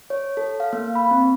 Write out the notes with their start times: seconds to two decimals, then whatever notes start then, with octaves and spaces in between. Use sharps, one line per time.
0.10 C#5
0.37 A4
0.60 F5
0.73 A#3
0.95 B5
1.11 C4